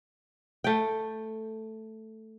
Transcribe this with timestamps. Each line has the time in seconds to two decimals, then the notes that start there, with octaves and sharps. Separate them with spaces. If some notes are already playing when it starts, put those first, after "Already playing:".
0.64 A3 G5